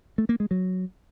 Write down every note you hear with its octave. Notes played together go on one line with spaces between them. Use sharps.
A3
A#3
G#3
F#3